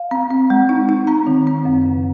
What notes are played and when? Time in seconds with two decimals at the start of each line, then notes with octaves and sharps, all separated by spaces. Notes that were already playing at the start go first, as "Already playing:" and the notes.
Already playing: F5
0.11 C4
0.30 C4
0.50 G#3
0.69 D#4
0.89 D#4
1.07 C4 A#5
1.27 D#3
1.47 C4
1.65 F#2
1.85 C#3